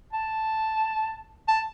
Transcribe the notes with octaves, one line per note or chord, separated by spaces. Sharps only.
A5
A5